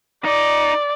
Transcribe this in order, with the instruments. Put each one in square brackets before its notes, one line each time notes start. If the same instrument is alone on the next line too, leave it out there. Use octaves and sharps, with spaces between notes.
[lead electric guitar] D#4 [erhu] D5